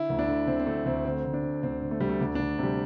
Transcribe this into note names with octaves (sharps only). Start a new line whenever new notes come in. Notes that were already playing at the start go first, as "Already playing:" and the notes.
Already playing: D3 E4
D2
D4
D3
D2 C4
C4
D3 A3
D2 C4
D3 C4
D2
D4
D3
D2 C4
D3
A3
D2 G3
A3
D2 D4
D2 D4
C3 G3